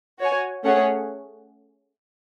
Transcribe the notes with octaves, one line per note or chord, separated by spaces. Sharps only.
F#4 C#5 G#5
A3 C#4 G#4 C#5 F#5